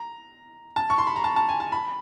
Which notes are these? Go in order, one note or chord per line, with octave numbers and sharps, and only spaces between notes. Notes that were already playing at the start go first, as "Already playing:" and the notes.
Already playing: A#5
A5
C#6
C6
B5
A#5
A5
A5
G#5
A5
B5